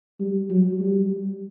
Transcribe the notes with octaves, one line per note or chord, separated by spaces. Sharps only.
G3
F#3
G3